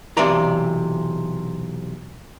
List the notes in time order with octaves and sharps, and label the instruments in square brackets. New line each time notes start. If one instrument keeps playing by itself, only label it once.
[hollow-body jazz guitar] B1 C3 E3 D5 A#5